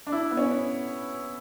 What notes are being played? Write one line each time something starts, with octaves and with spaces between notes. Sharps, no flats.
D4
E4
B3
C#4